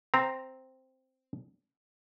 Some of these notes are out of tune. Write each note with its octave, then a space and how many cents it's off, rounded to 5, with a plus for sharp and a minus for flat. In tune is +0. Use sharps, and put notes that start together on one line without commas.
C4 +0 A#5 +0